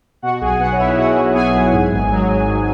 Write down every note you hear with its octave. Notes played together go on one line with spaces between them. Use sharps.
B2 F#4 F#5
B1 G#4 G#5
B3 F#4 F#5
C#5
B1 E4 E5
B2 F#4 F#5
B1
B3 G#4 G#5
B1
G#2
G#1
F#3
G#1
G#2